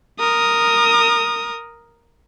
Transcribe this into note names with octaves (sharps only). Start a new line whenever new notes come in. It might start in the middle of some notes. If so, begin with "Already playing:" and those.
A#4 D#6